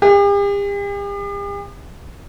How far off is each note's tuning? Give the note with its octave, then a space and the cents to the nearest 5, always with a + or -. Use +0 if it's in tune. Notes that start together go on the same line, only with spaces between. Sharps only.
G4 +45